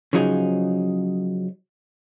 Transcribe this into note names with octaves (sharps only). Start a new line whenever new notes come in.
C#3 F3 F#3 D#4 G#4